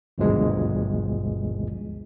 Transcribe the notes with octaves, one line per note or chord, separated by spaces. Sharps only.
G#1 D2 G2 B2 F3 G#3